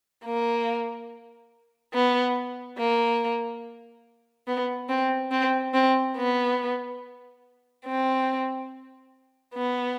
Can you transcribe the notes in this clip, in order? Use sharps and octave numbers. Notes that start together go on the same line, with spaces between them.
A#3
B3
A#3
B3
C4
C4
C4
B3
C4
B3